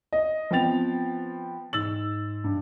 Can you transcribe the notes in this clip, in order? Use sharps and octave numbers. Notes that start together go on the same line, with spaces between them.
D#5
F3 B3 C4 G5 A6 F7
G#2 E6 A6 F#7
G2